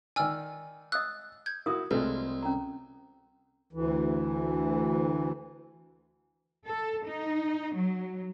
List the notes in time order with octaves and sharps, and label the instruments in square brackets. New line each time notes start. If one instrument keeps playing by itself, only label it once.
[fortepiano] D#3 D5 [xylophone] G#5 E6 F6
[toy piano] D#5 D#6 E6 [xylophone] F#6
[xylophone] G6 G#6
[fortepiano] E4 F#4 [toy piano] A#4 D#6
[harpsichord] C2 [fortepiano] G#3 A3 [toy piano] F4 B4
[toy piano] C#4 A#5
[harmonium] D2 E3
[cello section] A4
D#4
F#3